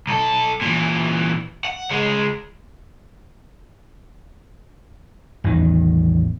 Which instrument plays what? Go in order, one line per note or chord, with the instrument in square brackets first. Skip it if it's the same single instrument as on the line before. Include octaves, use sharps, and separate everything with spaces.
[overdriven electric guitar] B1 A4
A#2 E3
F#5
C#2 G#3
[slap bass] A1 E2 D#3